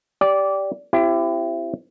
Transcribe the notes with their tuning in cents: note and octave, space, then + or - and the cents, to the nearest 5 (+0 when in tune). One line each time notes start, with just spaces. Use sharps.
G4 +0 D5 -15
C4 +0 E4 +30 G4 +0